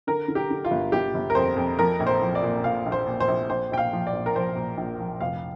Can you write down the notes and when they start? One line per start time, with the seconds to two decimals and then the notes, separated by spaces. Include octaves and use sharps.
0.07 D3 A#4
0.28 D3
0.35 G4
0.50 D3
0.65 F4
0.71 G1
0.92 G1 G4
1.14 G1
1.30 A#4
1.35 F2 C5
1.56 F2
1.79 F3 A#4
2.00 A#1
2.07 C5
2.22 F3
2.35 D5
2.42 A#2
2.64 A#2 F5
2.86 A#1
2.92 C5
3.07 A#2
3.20 C5
3.28 A#1
3.50 A#1 C5
3.72 A#1 G5
3.78 F5
3.93 F3
4.07 D5
4.13 A#1
4.26 A#4
4.35 F3 C5
4.57 A#2
4.77 A#1
4.99 F3
5.21 F1 F5